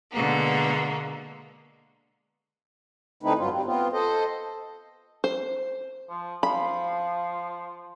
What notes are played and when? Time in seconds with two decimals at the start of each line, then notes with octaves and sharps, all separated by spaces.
0.12 B2 D3 G#3 A#3 B3
3.23 D3 A3 C4 D#4 E4 B4
3.38 G2 F#3 F4
3.52 G3 C4
3.65 B3 C4 F4
3.93 A4 C5 D#5
5.24 C5
6.09 F3
6.43 F3 F5 B5